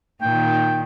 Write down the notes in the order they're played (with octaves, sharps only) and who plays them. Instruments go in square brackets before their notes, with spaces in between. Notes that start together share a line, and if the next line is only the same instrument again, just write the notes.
[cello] A#2 D#3 [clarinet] G5